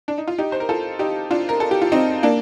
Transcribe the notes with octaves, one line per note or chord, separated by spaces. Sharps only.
D4
D#4
F4
D#4 G4
C5
A#4
F4 A4
D#4 G4
D4 F4
A#4
A4
G4
F4
C4 D#4
A#3 D4